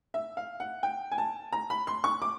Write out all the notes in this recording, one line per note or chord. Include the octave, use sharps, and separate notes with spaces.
E5
F5
F#5
G5
G#5
A5
A#5
B5
C6
C#6
D6